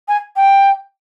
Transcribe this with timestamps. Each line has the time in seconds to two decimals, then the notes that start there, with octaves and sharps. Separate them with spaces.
0.08 G#5
0.36 G5